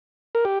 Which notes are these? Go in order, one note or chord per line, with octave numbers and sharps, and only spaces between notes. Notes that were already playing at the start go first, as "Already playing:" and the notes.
A#4
G4